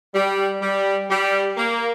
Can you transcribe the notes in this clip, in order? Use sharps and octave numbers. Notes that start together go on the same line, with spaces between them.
G3
G3
G3
A#3